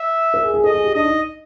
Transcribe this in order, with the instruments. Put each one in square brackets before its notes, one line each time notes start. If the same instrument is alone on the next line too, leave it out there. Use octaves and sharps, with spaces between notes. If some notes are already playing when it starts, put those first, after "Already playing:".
Already playing: [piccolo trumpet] E5
[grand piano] A#4
G#4
G#4
[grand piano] A4 [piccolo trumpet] D#5
[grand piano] G#4
G4
[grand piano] D4 [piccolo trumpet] D#5
[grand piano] D#4